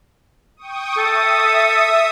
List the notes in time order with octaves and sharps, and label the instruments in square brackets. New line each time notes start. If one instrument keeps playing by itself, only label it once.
[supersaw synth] G5 C#6 D#6
[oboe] A4 [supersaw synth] E5 D#6